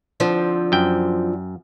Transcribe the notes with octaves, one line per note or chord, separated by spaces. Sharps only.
D3 F3 C4
F#2 G5